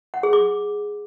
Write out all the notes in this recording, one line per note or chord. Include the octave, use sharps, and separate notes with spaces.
F#5
G#4
D6